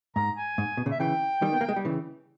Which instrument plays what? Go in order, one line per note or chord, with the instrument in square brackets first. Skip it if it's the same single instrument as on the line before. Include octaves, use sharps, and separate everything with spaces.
[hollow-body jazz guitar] G#2 [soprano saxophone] A#5
[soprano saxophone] G#5
[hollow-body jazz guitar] G#2
B2
A#2 C#3
[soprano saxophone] E5
[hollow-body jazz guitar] C#3 E3 [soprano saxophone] G5
[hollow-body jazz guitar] D#3 G3
B3
A#3
G#3
G3
C#3 E3